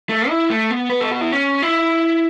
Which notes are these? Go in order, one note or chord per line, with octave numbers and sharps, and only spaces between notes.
A3
E4
A3
B3
B4
A4
F#4
E4
C#4
E4